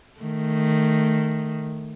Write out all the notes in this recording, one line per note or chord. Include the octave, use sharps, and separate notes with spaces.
D#3 A3